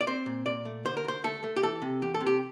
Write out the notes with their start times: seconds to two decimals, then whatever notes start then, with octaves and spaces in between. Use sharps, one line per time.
0.01 D5
0.07 C4 C5
0.26 A#2
0.46 A#2 D5
0.65 A3
0.85 D3 C5
0.97 A#4
1.04 D2 C5
1.24 A3 A4
1.44 A3
1.56 G4
1.62 E3 A4
1.82 C3
2.02 E2 G4
2.14 A4
2.20 C3
2.26 G4